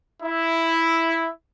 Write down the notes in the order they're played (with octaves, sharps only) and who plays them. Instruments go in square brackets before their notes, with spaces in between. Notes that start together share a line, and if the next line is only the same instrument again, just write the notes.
[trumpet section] E4